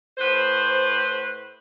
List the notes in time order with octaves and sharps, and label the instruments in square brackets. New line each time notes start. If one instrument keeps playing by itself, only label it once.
[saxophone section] A2 B4 C5